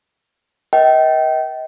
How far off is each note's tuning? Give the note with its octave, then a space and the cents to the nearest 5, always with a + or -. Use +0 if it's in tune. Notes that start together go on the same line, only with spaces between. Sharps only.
A#4 +35 D#5 +35 G5 -25